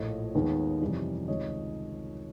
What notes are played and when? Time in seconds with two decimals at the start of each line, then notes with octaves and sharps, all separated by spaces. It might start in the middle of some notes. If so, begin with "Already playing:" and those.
Already playing: A#1 A2 F3 A3 C#5 D#5
0.35 D#2 D#3 G#3 B3 D#4
0.81 F2 C3 E3 G3
1.28 C#2 C3 D#3 C#5 D#5